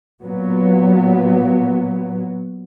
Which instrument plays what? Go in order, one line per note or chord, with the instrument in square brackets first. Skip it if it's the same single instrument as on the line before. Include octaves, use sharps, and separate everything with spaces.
[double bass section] A#2 F#3 B3